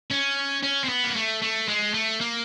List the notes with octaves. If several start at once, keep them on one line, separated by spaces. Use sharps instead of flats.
C#4
C#4
C4
B3
A#3
A3
A3
G#3
A3
A#3